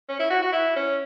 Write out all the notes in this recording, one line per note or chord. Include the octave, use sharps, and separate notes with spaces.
C#4
E4
F#4
F#4
E4
C#4